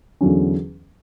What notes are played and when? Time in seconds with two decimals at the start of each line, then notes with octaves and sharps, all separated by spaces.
0.21 E2 D3 F#3 C#4